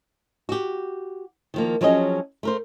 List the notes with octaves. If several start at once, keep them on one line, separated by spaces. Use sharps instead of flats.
F#4 G4
D#3 F3 A#3
F3 F#3 C4 C#4 G#4 D#5
A3 A#4 C5